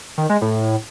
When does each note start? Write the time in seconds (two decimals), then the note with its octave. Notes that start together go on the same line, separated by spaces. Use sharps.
0.18 D#3
0.30 G#3
0.42 A2